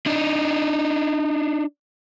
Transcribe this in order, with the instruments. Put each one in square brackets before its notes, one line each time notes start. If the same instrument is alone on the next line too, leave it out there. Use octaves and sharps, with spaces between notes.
[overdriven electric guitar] D4 D#4